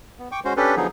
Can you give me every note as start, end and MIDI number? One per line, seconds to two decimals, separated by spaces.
0.19 0.28 59
0.32 0.40 79
0.32 0.40 85
0.32 0.40 86
0.45 0.53 56
0.45 0.53 61
0.45 0.53 66
0.45 0.53 72
0.57 0.75 61
0.57 0.75 62
0.57 0.75 67
0.57 0.75 69
0.57 0.75 71
0.76 0.87 50
0.76 0.87 53
0.76 0.87 54
0.76 0.87 59
0.76 0.87 63
0.76 0.87 68